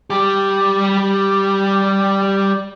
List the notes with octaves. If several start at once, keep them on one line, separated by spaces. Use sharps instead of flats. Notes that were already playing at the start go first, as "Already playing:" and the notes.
G3 G4